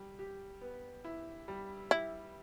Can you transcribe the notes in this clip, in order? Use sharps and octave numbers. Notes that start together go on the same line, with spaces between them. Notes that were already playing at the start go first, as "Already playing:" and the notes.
Already playing: G3
G4
B3
E4
G3
E4 G4